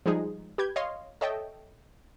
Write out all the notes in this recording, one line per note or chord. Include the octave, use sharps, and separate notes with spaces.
F3 G3 G#3 D#4 G#4
G4 B4 G6 G#6
C#5 D#5 F5 C6
A4 C#5 D#5 E5 G5 A5